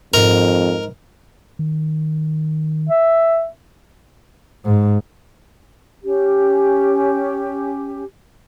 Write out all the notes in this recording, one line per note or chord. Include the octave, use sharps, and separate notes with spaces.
F2 G#2 A#4
D#3
E5
G#2
C#4 G4